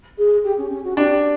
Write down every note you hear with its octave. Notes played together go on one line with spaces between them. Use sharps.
G#4
G4
C#4
C#4
F#4
D4 G4